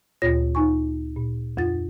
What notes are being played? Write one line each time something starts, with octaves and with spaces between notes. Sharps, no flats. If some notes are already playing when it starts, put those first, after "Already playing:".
D2 A#2 F4 C#5 A#6
D#4 G#5 C#6
A#2
F2 F4 A6